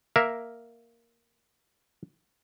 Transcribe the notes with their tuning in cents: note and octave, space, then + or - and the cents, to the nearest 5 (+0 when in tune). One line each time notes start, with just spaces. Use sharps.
A#3 +0 A#4 +0 E5 +0